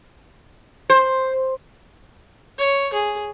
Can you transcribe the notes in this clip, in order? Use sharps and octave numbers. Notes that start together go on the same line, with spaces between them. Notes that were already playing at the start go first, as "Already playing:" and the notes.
C5
C#5
G#4